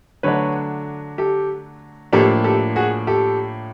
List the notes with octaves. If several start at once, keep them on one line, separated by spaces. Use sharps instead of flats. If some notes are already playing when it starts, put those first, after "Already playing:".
D3 F#3 A3 D4 B4 C#5
G4 A4
A2 F3 A#3 D4 G4 A4
G4 A4
F#4 G#4
G4 A4